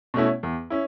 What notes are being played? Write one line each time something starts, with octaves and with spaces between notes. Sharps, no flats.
B2 A3 C#4 E4
E2
C#4 E4